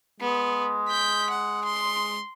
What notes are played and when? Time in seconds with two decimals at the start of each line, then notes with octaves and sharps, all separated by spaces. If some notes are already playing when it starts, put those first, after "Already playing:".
0.21 G#3 B3
0.89 G6 B6
1.30 F#5
1.65 C6